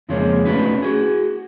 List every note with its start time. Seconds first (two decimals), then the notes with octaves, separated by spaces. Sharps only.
0.09 F2 C#3 F3 G#3 A#3 C#4
0.45 A3 B3 C#4 D#4 F#4 B4
0.82 F#4 G#4